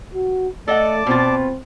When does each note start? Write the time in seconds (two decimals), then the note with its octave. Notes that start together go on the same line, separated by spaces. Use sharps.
0.14 F#4
0.68 A3 A4 D5 D#5 F#5 A5 D6
1.06 B2 C4 F4